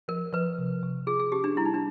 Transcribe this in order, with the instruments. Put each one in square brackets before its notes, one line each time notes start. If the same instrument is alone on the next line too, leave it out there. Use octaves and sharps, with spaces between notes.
[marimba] F3 [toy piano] A#4
[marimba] F3 [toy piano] B4
[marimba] C3
C3
[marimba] F4 [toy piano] G#4
[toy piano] G#4
[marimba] C#4 [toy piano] G4
[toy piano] D4
[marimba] G3 [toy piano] E4
[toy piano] D#4
D4